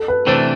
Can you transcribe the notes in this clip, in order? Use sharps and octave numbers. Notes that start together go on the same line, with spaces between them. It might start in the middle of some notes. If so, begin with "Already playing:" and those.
Already playing: A4
B4
C3 E3 A3 D4 C5